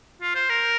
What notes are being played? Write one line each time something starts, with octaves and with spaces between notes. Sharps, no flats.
F4
C5
A#4